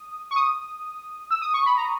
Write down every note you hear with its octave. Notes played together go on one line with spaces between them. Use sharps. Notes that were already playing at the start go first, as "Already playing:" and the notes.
Already playing: D#6
C#6
D#6
E6
D#6
C#6
B5
A#5